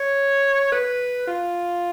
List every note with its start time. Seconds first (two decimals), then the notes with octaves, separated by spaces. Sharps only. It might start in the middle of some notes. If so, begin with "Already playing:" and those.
Already playing: C#5
0.72 B4
1.27 F4